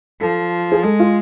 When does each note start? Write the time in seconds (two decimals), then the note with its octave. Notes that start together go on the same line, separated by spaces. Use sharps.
0.21 F3 A4
0.72 G#4
0.84 G#3 A4
1.00 F4